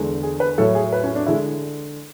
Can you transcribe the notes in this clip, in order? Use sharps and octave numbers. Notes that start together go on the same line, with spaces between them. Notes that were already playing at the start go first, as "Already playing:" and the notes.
Already playing: E2 D3 G#3
G#4
B4
A2 F#3 A4
G#4
B4
C#4
D4
D3 G#3 E4